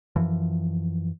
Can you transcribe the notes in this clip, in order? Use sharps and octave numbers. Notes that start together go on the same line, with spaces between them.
F#2 E3 F3